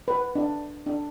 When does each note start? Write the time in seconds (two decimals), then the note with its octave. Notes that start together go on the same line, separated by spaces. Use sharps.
0.08 B4
0.35 D4
0.86 D4